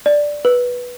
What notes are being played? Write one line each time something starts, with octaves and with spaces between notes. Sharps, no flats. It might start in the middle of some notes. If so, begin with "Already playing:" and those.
D5
B4